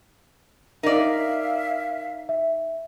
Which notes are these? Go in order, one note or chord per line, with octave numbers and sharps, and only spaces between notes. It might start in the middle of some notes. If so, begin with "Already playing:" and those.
D#4 A#4 D5 E5 F5
E5